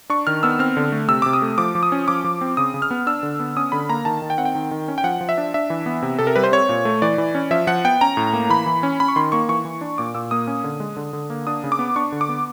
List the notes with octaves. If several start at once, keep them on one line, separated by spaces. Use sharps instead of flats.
D4 C#6
D#3 F6
B3 E6
C4 F6
D3
A3
C3 E6
C3 D6
D#6
A3
F3 D6
F3
D#6
C#4
F3 D6
F3
C4
C#3 D#6
C#3
F6
B3
D4 E6
D3
B3
C#4 D#6
D3 B5
A#3 A#5
D#3 A5
D#3
G5
C4 F#5
G5
D#3
D#3
C#4
G5
F3 F#5
F3
E5
D4
D4 E5
E3
B3
C3
C3 A4
A#4
G3 B4
C5
C4 C#5
A#2
A3
E3 D5
E3
C#4
F3 E5
F3 F#5
B3 G5
C#4 A#5
A2
A#3
E3 B5
E3
C#4
C#4 B5
C#6
D#3 C6
A#3 C#6
E3 C#6
E3
D4
A#2 D6
A#2 E6
A#3 D#6
C#4
D3
G#3
D3
D3
A#3
D4 D#6
C#3
D6
B3
D4 C#6
D3
D6
B3